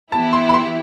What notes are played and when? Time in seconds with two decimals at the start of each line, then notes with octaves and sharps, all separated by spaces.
0.12 E3 B3 E4 G4 A5
0.33 C6
0.49 B5
0.54 C6